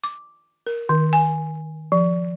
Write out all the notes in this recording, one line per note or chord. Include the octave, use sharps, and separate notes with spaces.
D6
A#4
D#3
G#5
F3